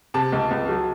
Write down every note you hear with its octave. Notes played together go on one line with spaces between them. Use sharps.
C3 A5
C#2
C#2
F#3